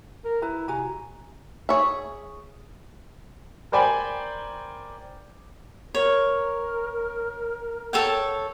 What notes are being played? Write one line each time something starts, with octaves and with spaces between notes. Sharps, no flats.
A#4
E4 B4 A#5
C3 F#4 G#5 A#5
G#4 C#5 E5
A#4 C5 D5 G5 G#5 B5
A#4 C#5
A4 C#5 G5